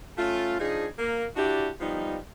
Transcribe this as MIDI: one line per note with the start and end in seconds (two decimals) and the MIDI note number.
0.17 0.58 57
0.17 0.58 61
0.17 0.58 65
0.59 0.86 53
0.59 0.86 62
0.59 0.86 63
0.59 0.86 68
0.99 1.25 58
1.36 1.68 62
1.36 1.68 64
1.36 1.68 66
1.36 1.68 67
1.36 1.68 74
1.81 2.18 53
1.81 2.18 55
1.81 2.18 59
1.81 2.18 63